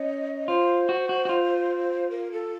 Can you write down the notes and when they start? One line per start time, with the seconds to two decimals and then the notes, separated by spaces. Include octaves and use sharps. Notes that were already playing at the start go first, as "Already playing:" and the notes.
Already playing: C#4 D#5
0.47 F4 C5
0.89 F#4
1.09 F#4
1.25 F#4
1.29 F4
2.10 A#4
2.32 A4